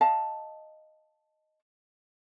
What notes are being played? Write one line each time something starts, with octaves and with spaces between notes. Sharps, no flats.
D#5 F5 A5 A#5